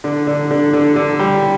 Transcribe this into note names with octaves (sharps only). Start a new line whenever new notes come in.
D3
D3
D3
D3
D3
G3